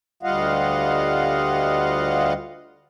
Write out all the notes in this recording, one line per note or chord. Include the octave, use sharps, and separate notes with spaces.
D2 G3 F4 D#5 F5 F#5